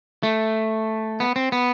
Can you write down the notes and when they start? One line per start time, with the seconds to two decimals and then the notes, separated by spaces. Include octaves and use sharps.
0.23 A3
1.20 B3
1.36 C4
1.52 B3